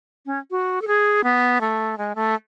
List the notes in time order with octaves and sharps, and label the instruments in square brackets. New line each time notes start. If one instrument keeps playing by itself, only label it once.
[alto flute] C#4
F#4
A4
G#4
B3
A3
G#3
A3